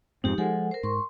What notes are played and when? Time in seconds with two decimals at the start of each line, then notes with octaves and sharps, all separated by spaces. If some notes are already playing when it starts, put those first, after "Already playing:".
0.24 F2 G#2 C4 D#4 G4
0.38 F3 G#3 A4 F#5 G#5
0.71 A#4 C5
0.83 G#2 C6 C#6